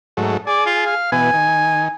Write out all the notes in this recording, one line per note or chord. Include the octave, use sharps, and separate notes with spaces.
G#2 F#3 A3
G#4 D5
F4
F5
B2 E3 B3 G#5
D#3